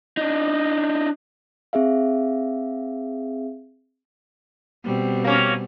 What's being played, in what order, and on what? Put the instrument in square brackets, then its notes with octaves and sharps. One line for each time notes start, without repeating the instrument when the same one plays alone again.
[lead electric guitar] D4 D#4
[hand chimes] C4 G#4 E5 F5
[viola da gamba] B2 G3 C4
[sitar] A#3 C#4